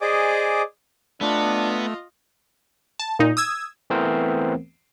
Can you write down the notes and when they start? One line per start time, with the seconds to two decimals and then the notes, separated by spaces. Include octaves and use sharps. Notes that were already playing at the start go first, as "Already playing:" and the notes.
0.01 G#4 C5 D5 D#5 G#5 D6
1.21 A3 B3 D4 F4 D#5
2.99 A5
3.19 A#2 D#4
3.37 D#6 E6 G#6
3.90 E3 A3 B3 C4 A#4 C5